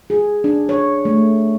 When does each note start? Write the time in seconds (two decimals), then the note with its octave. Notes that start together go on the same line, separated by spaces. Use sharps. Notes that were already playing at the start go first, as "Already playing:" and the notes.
0.10 G#4
0.44 D4
0.69 C#5
1.05 A3